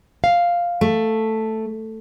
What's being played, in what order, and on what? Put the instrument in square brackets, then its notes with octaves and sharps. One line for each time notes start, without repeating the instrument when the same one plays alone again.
[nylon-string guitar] F5
[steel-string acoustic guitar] A3